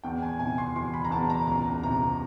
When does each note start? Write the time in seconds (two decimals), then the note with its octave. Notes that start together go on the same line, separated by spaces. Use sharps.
0.04 E2 G5
0.22 G#5
0.39 C3 G#5
0.58 C6
0.75 E3 C6
0.94 B5
1.05 A#5
1.11 E2 A5
1.30 A#5
1.47 C#2 A#5
1.83 C3 A#5